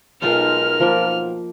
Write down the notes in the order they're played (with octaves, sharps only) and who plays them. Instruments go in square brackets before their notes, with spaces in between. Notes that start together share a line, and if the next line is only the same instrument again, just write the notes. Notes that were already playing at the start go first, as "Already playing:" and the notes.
[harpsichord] B1 F4 C5 [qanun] G#3 D#4 A4 [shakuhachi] A#4 [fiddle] F6
[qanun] F3 A#3